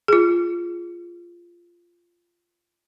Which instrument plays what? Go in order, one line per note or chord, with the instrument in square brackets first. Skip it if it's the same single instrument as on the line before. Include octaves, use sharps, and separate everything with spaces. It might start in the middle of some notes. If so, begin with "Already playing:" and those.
[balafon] F4 G#4